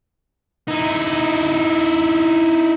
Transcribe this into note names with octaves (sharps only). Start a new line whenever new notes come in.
D#4 E4